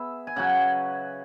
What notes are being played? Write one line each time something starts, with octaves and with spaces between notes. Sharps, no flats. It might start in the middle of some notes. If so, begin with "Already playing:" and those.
Already playing: B3 G#4 E5
G#5
C#3 F#3 C#4 F#5